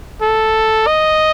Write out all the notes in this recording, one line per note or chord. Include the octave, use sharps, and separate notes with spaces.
A4
D#5